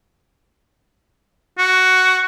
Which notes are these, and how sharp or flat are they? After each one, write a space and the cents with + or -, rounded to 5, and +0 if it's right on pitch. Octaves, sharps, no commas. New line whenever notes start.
F#4 +10